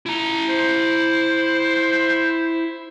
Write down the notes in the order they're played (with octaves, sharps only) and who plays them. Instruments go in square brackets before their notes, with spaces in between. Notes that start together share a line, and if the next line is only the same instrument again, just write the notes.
[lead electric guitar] E4 A#5
[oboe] C5